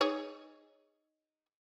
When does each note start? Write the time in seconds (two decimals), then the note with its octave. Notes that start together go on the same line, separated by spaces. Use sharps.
0.01 D#4 G#4 C#5